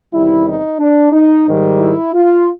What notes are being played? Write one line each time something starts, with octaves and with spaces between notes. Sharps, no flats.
E2 C3 D#3 G3 E4
D#4
D4
D#4
G#2 D#3 G3
E4
F4